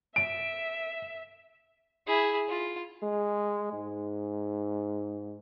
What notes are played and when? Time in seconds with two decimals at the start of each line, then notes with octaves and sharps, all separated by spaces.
0.16 E5 D7
2.07 E4 G#4
2.49 F4
3.02 G#3
3.73 G#2